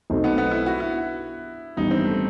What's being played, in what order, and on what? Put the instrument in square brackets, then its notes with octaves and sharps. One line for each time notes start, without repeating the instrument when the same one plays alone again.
[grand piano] B1 B2 A3 C4 D#4
[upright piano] B3
B3
E4
F#4
E4
[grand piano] A1 G2 D#3 G3 B3 [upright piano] D#4
[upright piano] C4
A3